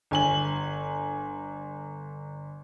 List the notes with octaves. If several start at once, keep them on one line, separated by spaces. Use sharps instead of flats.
G1 G#5 F#7